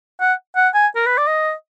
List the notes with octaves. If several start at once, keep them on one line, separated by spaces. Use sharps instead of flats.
F#5
F#5
G#5
A#4
B4
D5
D#5